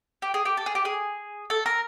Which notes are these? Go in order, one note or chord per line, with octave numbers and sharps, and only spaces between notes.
G4
G#4
G4
A4
G#4
G4
G#4
A4
A#4